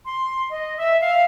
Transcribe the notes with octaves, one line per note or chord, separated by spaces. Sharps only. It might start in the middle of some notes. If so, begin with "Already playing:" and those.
C6
D#5
E5
F5